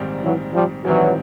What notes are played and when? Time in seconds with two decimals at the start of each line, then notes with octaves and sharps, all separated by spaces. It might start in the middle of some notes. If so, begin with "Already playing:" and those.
Already playing: A#1 G#2 D#3 G3 C4
0.23 E3 F#3
0.53 F3 G3
0.84 A#1 G#2 D#3 E3 F#3 G3 C4